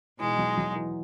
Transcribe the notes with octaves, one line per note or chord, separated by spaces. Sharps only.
B2 E3 G#3 D#4
F#3
F#3
E3